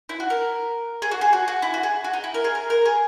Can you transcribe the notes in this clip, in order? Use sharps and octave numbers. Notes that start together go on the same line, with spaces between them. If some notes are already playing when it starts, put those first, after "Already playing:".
E4
F#4
A#4
G#4
F#4
G#4
F#4
F#4
E4
F#4
G#4
F#4
D#4
E4
A#4
G#4
A#4
A#4
G#4